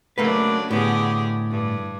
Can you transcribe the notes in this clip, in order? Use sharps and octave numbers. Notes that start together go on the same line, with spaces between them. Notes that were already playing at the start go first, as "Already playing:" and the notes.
C#3 F#3 A3 A#3 D4 B4
A2 D3 B3 G4 G#4
G2